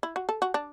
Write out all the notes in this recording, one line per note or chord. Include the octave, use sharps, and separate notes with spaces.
E4
F#4
A4
F#4
D4